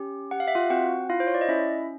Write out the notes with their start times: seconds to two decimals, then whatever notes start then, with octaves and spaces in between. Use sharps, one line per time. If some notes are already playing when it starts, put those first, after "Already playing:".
Already playing: C#4 G4
0.31 G4 F#5
0.40 F5
0.48 E5
0.55 F4 F5
0.70 C4 F#4 F#5
1.10 E4 F4 F5
1.20 C5
1.27 C#5
1.34 D5
1.41 D#5
1.48 C#4 E4 E5